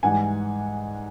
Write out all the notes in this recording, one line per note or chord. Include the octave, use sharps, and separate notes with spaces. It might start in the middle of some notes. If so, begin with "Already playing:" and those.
G#2 E3 G3 F#5 G#5